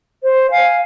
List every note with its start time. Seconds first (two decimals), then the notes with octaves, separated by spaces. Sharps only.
0.23 C5
0.50 F5 G#5